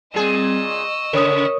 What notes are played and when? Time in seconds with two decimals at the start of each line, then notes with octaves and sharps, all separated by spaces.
0.14 A#2 G3 C4 G#4 D#5 E6
0.64 C#6
1.13 C#3 A#4 C#5 D#6